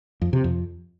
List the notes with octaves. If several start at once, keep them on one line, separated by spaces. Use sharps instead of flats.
F2
C3
F2